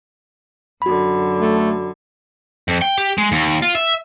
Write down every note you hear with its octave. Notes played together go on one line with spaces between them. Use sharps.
F#2 D3 F#4 B5
A3
F2
G5
G4
G#3
D#2
F4
E5